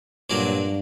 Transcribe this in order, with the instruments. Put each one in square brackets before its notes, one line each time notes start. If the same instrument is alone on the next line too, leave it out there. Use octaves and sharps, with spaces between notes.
[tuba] G2 [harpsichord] A#2 F#3 A#3 D4